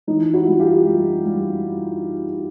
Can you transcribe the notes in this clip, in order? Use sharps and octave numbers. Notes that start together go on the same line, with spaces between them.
E3 D#4
E4 F#4
G3
F4 G4
G3
G3